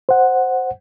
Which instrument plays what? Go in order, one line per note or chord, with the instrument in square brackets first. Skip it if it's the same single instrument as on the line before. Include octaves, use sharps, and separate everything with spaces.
[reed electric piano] C5 F#5